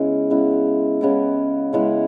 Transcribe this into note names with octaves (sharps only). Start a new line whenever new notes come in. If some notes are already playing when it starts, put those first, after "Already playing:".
Already playing: C#3 G#3 B3 E4
C#3 G#3 B3 E4
C#3 G#3 B3 E4
C#3 G#3 B3 E4